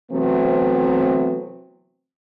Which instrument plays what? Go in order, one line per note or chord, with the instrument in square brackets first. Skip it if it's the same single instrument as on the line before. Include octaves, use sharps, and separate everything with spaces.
[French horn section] C3 E3 F#3 A3 B3 C4